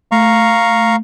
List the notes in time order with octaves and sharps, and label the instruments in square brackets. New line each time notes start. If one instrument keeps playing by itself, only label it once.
[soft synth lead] A3 [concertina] F5 A#5 C#6